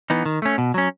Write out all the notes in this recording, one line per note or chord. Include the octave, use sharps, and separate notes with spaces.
E3 B3 D#4
D#3
A3 C#4
B2
F#3 C#4